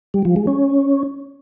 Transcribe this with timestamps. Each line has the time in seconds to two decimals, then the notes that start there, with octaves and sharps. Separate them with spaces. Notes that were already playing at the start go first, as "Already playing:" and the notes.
0.14 G3
0.25 F3
0.36 G#3
0.47 C#4